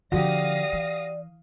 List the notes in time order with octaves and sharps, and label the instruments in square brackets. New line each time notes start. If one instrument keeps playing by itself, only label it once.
[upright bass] D3 F3 [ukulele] F#4 G4 [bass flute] D5 [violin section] F5 D#6 A#6
[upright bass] E3